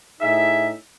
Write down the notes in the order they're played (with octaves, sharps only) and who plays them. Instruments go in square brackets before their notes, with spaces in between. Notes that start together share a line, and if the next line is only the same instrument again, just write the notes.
[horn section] A2 D#4 G#4 E5